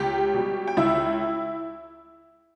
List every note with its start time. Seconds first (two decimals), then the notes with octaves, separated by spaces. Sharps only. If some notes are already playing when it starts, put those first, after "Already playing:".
Already playing: C#2 G4
0.34 B2 G3
0.68 G5
0.77 C#2 E4 E5